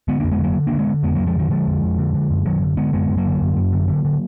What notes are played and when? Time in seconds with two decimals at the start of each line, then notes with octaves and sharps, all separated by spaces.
0.08 D3 G#3 B3
0.20 F2 A#3 D4
0.31 G#3 B3
0.39 D3 F#3 A#3
0.56 D3
0.67 D3 A#3 D4
0.79 G#3 B3
0.87 D3
1.03 F2 G#3 B3
1.15 F2 F#3 A#3
1.27 F3 G#3
1.35 D3 D#3 F#3
1.50 D3 F3 G#3
1.67 F2
1.83 F2
1.98 D3
2.14 D3
2.30 F#2
2.46 F#2 D#3 F#3
2.62 D3
2.77 D3 G#3 B3
2.93 F#2 G#3 B3
3.09 F#2
3.17 F#3 A#3
3.26 D3
3.41 F#2
3.56 F#2
3.73 D3
3.88 D3
4.05 D3